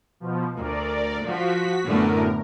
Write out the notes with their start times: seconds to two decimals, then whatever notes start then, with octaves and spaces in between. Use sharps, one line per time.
0.20 B2 F3
0.57 D2 A#4 D5
1.26 F3 F#4 B6
1.85 F#2 A2 D3 A3 B3 A#4